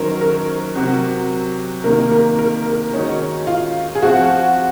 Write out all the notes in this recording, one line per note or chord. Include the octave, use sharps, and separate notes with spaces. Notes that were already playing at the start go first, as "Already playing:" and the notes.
Already playing: D#3 F#3 C#4 A#4 C5
A#4
C3 F#3 C4 F#4
C3 D#3 A#3 A#4
A#4
A#4
A#4
D#3 G#3 C#4 D#4 F#4
F4
G#4
F3 C4 F4 F#4